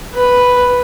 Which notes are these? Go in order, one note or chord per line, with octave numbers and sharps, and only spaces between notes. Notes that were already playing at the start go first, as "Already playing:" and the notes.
B4